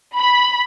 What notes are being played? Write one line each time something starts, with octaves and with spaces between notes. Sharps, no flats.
B5